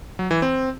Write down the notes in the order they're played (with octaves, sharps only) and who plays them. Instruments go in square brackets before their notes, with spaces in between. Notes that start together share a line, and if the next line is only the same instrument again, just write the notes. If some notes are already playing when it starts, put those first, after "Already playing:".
[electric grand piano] F#3
E3
C4